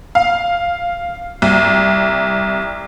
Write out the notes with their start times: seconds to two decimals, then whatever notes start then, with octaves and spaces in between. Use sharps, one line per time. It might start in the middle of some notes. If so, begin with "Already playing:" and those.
0.15 F5
1.42 C2